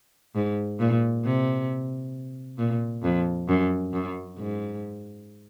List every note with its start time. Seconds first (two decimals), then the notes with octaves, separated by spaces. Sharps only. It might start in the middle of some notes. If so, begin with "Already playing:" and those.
0.35 G#2
0.80 A#2
1.24 C3
2.58 A#2
3.03 F2
3.49 F#2
3.93 F#2
4.38 G#2